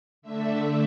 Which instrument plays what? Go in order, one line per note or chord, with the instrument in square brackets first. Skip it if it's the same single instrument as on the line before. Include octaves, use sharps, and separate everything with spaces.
[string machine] D3 A3 D4 E5